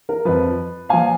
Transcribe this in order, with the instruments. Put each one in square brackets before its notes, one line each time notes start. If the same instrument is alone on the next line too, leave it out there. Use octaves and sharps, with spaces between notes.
[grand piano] A#4
F2 F3 B4
A#2 F3 F5 G#5